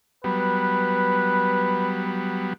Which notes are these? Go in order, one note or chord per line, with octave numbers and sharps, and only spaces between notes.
F#3 G3 B3 B4